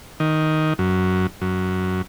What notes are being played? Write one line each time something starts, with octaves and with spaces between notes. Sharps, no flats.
D#3
F#2
F#2